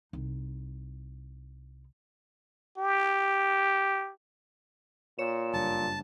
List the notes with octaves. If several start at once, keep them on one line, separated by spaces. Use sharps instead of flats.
C2 D#4
G4
A#2 C#5 E7
F#1 G2 A5